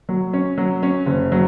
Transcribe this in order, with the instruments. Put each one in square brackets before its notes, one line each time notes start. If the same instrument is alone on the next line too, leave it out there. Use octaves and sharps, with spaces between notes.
[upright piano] F#3
C#4
F#3
C#4
F#1
F#3